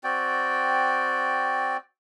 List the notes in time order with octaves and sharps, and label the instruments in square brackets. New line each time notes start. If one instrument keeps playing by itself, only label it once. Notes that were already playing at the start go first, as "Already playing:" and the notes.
[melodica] C4 F#4 D5 G5